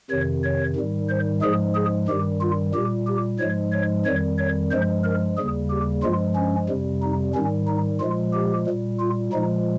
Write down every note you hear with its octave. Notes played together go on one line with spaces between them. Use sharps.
F2 C3 D#3 C#5
C#5
G#2 D#3 G3
C5
G#2 F3 G#3 G#4
G#4
G2 D#3 G3 G4
F4
A#2 G3 G4
G4
G#2 F3 G#3 C#5
C#5
F2 D#3 G3 C#5
C#5
G2 F3 G#3 C5
A#4
D#2 C#3 G3 G#4
G4
G2 F3 G#3 F4
C#4
F2 C3 G3
D#4
G#2 D#3 G3 C#4
D#4
A#2 F3 G#3 F4
G4
A#2 G3
F4
A#2 F3 G#3 D#4